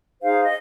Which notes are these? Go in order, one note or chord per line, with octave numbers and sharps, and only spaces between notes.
D#4 G#4 C5 F5
D#5